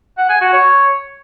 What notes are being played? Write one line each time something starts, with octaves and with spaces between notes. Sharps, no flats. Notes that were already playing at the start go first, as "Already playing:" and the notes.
F#5
G#5
F#4
C#5